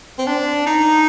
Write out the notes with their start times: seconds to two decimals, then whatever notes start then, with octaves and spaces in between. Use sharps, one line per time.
0.18 C4
0.27 D4
0.67 D#4